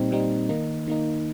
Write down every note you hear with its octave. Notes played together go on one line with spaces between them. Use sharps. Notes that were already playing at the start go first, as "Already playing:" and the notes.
Already playing: A#2 G3 C4 D#4
A#2 G3 C4 D#4
D#3 A#3 D#4
D#3 A#3 D#4